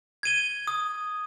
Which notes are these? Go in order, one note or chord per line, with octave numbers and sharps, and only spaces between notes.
G#6 D#7 G7
D#6